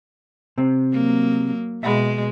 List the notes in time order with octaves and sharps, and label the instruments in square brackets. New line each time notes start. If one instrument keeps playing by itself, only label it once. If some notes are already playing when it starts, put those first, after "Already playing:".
[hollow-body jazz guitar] C3 C4
[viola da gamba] F#3 A#3
[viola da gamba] B2 G#3 [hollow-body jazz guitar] E5 F#5 B5